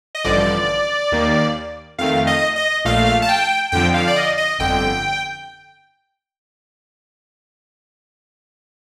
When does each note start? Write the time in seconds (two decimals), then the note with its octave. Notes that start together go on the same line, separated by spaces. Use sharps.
0.15 D#5
0.24 A1 G2 D3 F3 D5
1.12 D#2 D#3 A#3
1.98 F2 D#3 A3 F5
2.27 D#5
2.56 D#5
2.85 A#1 A#2 A3 F5
3.22 A5
3.29 G5
3.72 F2 D3 F3 G5
3.94 F5
4.08 D5
4.16 D#5
4.38 D#5
4.59 G1 F2 D3 G5